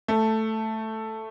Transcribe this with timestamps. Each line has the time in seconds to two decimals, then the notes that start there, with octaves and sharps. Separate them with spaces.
0.08 A3